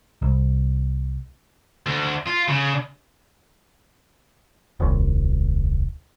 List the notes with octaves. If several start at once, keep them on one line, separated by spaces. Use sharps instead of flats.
C2
D2
F4
C#3
D#1 C2